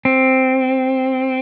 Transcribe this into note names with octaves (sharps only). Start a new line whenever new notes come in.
C4